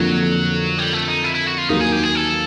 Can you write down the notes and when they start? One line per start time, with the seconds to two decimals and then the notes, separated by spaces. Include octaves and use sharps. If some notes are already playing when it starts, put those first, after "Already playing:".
Already playing: F2 D3 F3 F#3 A#3 D4
0.78 G3
0.93 A3
1.08 D#4
1.24 E4
1.35 E4
1.46 F#4
1.58 F4
1.69 D#2 D#3 F#3 A#3 D#4
1.81 G#4
1.92 G4
2.03 G#4
2.15 A4